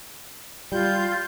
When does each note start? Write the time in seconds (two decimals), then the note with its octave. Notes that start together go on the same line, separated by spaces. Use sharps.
0.72 G3 F4 G6